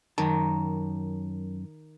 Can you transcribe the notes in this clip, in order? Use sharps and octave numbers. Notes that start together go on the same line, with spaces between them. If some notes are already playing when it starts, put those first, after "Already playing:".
F#2 D#3 A5